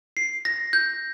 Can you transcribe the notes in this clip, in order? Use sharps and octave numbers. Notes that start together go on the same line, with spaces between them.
C7
A#6
G6